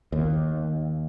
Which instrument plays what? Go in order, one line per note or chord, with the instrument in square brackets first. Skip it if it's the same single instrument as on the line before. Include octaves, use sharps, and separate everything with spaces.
[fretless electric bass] D#2